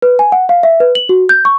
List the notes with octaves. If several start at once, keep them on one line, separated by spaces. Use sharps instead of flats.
B4
G#5
F#5
F5
E5
B4
F#7
F#4
G6
C#6